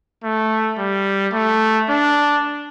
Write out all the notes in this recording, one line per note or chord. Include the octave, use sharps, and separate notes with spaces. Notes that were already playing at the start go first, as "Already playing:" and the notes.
A3
G3
A3
D4